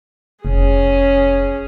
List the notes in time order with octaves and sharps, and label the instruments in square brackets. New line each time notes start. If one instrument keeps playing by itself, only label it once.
[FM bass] F1 [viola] C#4 G#4